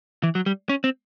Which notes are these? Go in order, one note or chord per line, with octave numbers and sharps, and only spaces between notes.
E3
F#3
G3
C#4
C4